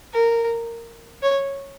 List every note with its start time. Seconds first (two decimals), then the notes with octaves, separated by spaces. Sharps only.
0.13 A#4
1.22 C#5